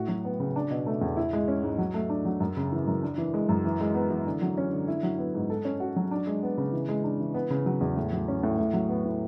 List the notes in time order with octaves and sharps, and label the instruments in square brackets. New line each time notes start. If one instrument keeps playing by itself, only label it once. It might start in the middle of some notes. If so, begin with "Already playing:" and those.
Already playing: [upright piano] A2 F#4
F#3
B3
C#3
D4
B2
A3
E2
E4
G#3
C#4
G#2
F#3
A3
D4
F#3
F#2
C#3
E3
F#2
D4
E3
G#3
F#2
E3
G#3
B3
E3
D3
F#3
C#4
D3
E4
F#3
B3
G#2
A4
C#4
F#4
F#3
D4
G#3
B3
C#3
E3
G#3
D4
E3
B3
C#3
F#3
E2
A2
F#3
C#4
A2
A2
F#3
B3
A2